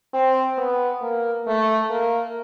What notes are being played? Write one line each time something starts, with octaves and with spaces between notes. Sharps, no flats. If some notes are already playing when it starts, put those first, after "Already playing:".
C4
B3
A#3
A3
A#3